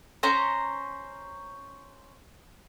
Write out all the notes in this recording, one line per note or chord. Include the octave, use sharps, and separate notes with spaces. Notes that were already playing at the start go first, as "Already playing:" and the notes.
C#4 C5 A#5